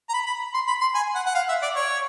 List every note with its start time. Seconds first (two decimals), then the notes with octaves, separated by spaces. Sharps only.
0.09 A#5
0.14 B5
0.27 B5
0.54 C6
0.68 B5
0.81 C6
0.95 G#5
1.15 F#5
1.26 F#5
1.35 F5
1.49 E5
1.62 D5
1.76 C#5